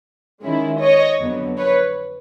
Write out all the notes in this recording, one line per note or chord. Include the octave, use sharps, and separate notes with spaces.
D#3 G#3 C#4 E4
C#5 D#5
F2 D3 F#3 B3
B4 C#5